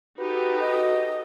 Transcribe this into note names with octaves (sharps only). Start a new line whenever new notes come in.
D#4 F#4 G4 A4 B4
F#4 D#5